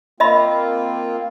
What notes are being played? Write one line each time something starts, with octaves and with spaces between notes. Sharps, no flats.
A#3 C4 F4 D#5 E5 B5